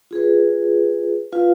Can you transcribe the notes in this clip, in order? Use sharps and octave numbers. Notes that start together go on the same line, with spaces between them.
F4 G#4 B4
F4 B4 F5